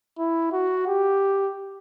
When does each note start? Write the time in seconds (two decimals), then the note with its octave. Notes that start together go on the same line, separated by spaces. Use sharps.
0.18 E4
0.53 F#4
0.88 G4